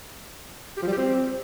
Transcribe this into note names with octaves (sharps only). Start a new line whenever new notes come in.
G4
F3
G3
G4
C4